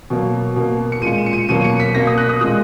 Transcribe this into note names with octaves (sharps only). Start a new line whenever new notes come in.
B2 F#3 A#3
B2 A#3
C#7
A#2 G#3 D#7
E7
C#7
D#7
B2 F#3 A#3 D#7
C#7
B6
B2 A#3 A#6
D#6
F#6
D#6
A#2 G#3 D#6